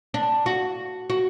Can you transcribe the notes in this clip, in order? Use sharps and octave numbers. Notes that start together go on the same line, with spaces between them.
D4
F#4
F#4